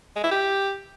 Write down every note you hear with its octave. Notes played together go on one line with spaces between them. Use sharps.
G#3
E4
G4